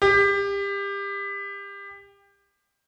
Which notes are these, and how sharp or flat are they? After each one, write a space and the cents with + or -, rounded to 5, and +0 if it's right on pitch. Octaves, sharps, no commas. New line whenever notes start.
G4 +25